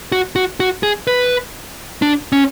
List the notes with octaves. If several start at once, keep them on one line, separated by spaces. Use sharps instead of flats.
F#4
F#4
F#4
G#4
B4
D4
C#4